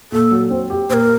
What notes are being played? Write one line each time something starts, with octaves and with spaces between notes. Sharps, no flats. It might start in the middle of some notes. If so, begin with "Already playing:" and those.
A#2 A4
F#3
C4
G4
A#2 A#4 C5